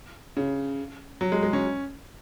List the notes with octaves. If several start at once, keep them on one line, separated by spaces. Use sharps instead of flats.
C#3
F#3
G#3
G#3
C#4